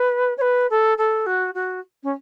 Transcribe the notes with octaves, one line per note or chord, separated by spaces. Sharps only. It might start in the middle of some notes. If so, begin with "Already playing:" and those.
Already playing: B4
C#5
B4
A4
A4
F#4
F#4
C#4